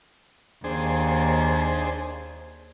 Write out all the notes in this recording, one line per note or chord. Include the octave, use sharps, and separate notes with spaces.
D#2 D4 G#4 C5